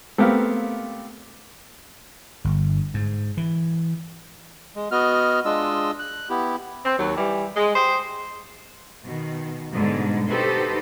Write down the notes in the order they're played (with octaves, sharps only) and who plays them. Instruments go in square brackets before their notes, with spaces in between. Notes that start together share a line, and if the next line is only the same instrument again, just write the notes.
[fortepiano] A3 B3 C4 G4 A#4 F5
[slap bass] G1
G#2
E3
[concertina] G#3
B3 F#4 D#5 F6
G#3 D4 F4 D#5 E6
F#6
B3 E4 G4
[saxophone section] C4
D#2 F#3
E3 G3
G#3
G4 G#4 C5
[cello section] B2 D#3
G#2 B2 D3 G3 G#3
D#4 F#4 G4 A4 B4 C5